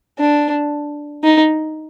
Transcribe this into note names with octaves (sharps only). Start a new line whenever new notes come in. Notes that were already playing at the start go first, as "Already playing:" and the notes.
D4
D#4